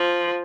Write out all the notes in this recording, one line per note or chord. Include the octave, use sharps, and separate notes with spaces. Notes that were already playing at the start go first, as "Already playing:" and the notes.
Already playing: F3